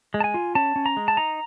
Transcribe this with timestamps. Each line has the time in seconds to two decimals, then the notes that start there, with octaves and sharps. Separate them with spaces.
0.14 G#3
0.20 A5
0.24 G#5
0.34 F4
0.55 C#4 A5
0.76 C#4
0.86 A#5
0.97 G#3
1.08 A5
1.17 D#4 A#5